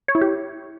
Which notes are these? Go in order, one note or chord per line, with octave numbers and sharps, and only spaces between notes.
C#5
E4
G4